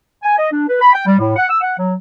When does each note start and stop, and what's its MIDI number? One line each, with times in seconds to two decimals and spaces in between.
0.23 0.36 80
0.38 0.49 75
0.51 0.63 62
0.68 0.80 71
0.81 0.90 83
0.93 1.05 79
1.06 1.17 55
1.19 1.33 45
1.36 1.49 78
1.49 1.57 88
1.61 1.76 78
1.78 1.93 54